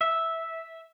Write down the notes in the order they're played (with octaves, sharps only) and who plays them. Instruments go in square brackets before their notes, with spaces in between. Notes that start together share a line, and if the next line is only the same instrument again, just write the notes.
[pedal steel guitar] E5